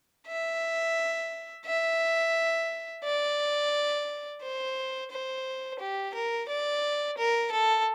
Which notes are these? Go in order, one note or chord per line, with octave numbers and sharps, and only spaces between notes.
E5
E5
D5
C5
C5
G4
A#4
D5
A#4
A4